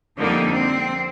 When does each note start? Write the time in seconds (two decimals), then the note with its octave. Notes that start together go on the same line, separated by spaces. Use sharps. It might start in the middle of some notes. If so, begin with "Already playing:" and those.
0.17 F2 D3 G3 A#3 D#4
0.52 C4